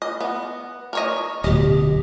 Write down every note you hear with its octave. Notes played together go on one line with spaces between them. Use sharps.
D#5
B3
A#4 C#5 D#5
D1 B2 G4 D#5